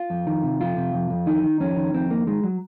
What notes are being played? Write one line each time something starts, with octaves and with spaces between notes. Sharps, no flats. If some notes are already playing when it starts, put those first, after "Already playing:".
Already playing: F4
F2
D#3
C3
F2 F4
C3
F2
F2
D#3 D#4
D#3
F2 C#4
D#3
F2 C4
D#3 A#3
D#3 G#3
F#3